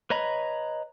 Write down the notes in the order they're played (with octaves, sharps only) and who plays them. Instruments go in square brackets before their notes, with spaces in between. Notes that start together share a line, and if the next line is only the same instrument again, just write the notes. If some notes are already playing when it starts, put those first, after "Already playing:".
[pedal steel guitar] B4 C#5 D#5 A#5 B5